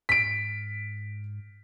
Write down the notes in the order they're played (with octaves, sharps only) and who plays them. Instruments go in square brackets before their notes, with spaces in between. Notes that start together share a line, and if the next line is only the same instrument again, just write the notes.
[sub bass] G#2 [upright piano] B6 D7